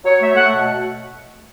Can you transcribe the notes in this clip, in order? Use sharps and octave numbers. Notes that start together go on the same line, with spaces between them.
F#3 C#5
A3 E5
A3 F#5
B2